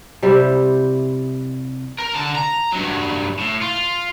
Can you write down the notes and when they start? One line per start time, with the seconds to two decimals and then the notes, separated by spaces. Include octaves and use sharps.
0.23 C3 G3 E4 G4
2.00 A#4
2.15 D3 A5
2.35 A#5
2.72 G2 F#3
3.39 A2
3.62 F4